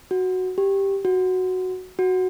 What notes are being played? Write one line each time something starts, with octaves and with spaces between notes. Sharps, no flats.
F#4
G4
F#4
F#4